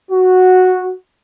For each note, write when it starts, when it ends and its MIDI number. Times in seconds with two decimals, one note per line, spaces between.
0.11 0.92 66